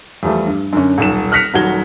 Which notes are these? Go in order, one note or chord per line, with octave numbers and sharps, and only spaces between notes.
E2 F3 G3 A3
G2
F#2 D3 C#4
D#1 B1 E7
F6 F#6 A#6 B6 C#7 F7
D#1 D#2 F#3 F#4 G#6 G7